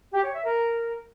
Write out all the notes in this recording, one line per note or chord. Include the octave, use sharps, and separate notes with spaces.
G4
C#5
E5
A#4